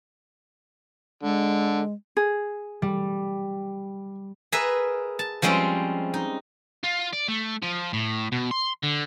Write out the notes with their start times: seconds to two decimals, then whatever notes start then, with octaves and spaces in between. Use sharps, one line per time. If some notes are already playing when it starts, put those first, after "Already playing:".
1.23 D3 G#3
2.17 G#4
2.82 G3
4.52 G#4 A#4 B4 E5
5.19 A5
5.42 F3 G3 G#3 C4 C#4
6.14 D#4
6.83 F4
7.13 D5
7.28 A3
7.62 F3
7.93 A2
8.32 B2
8.51 C6
8.83 D3